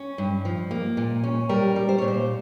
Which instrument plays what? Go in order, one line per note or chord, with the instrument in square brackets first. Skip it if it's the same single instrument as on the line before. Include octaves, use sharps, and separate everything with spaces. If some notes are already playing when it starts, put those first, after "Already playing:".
Already playing: [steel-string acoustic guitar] C#4
G2
F3
A#3
A#2
C#4
G3 A#4
G3
C5
A#2 C#5
C5